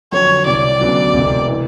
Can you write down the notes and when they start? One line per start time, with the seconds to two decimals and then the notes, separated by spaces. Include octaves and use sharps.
0.12 F2 D3 F#3 C#5
0.46 C2 C3 E3 D5
0.80 D2 C#3 F#3 B3 D4
1.13 E1 E2 C3
1.48 C3 E3